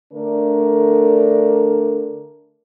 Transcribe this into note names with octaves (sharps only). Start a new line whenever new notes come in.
D3 A3 D4 A#4